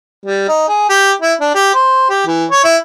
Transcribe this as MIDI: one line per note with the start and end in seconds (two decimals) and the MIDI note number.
0.26 0.47 55
0.48 0.67 63
0.68 0.88 68
0.89 1.12 67
1.22 1.33 64
1.41 1.50 62
1.55 1.70 67
1.75 2.07 72
2.10 2.26 67
2.27 2.45 52
2.50 2.63 73
2.64 2.76 64